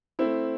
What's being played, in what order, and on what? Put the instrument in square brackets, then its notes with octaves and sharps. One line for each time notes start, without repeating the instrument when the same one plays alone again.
[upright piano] A3 C4 E4